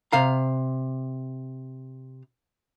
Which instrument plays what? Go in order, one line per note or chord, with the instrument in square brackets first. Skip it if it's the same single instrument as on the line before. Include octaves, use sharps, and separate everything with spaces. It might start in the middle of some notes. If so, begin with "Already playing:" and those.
[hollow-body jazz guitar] C3 F5 A#5